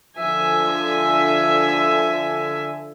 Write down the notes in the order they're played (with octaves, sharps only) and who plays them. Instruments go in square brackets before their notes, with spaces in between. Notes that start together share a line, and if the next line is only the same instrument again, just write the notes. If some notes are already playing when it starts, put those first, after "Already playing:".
[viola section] D3 F3 E5 G#5